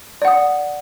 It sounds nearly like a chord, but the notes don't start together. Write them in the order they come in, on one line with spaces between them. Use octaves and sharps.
D5 F#5 D#6